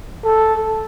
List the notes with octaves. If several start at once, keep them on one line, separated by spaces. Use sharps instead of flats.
A4